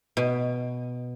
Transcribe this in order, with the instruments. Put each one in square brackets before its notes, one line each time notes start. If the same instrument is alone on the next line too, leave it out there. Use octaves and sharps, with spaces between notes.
[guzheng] B2